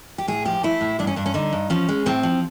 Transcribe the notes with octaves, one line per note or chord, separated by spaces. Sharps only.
G4
A2 G#4
F3 G4
A3 E4
A2
G2 D4
C#4
G2 D4
C#4
D3 D#4
G2
F3 C#4
G#3
A2 C4
F3